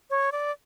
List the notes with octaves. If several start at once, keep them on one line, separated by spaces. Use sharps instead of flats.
C#5
D5